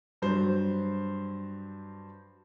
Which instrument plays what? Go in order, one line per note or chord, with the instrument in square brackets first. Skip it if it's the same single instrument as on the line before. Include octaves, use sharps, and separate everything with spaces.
[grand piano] G2 F#3 C5